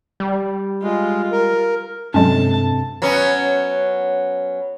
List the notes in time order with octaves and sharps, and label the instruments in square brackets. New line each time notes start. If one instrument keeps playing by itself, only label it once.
[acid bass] G3
[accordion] G#3 [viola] F4
[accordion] A#4
[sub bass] G2 [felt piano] C3 A4 [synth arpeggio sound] F#3 G#3 C#4 [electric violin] A5
[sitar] F#3 B3 C#4